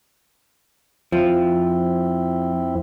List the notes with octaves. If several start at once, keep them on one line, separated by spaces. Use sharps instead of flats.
F2 F3 C4 E4